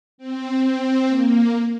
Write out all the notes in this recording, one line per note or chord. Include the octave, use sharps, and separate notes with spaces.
C4
C4
A#3